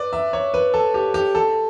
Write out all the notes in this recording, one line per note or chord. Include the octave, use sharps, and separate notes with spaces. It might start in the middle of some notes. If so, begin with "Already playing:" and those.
Already playing: B4 D5
E5
C#5
B4
A4
G4
G4
A4